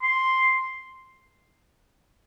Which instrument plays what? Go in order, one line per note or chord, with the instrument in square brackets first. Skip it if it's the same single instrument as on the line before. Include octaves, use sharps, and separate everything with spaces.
[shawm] C6